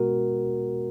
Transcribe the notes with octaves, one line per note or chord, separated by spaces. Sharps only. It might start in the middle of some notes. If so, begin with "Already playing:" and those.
Already playing: B2 G#3 B3 F#4 A#4